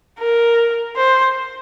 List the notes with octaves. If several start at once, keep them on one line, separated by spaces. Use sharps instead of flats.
A#4
C5